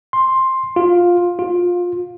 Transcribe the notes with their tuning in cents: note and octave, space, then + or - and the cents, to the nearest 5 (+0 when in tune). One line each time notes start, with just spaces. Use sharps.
C6 +10
F4 +10
F4 +20